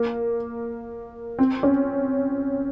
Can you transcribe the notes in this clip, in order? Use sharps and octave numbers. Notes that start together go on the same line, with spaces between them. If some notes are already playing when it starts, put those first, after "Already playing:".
Already playing: A#3
C4
C#4